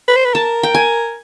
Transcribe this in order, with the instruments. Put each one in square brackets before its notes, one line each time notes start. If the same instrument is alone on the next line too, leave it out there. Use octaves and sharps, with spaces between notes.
[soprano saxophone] B4
C5
B4
[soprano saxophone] A#4 [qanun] A5
[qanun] G5
G#5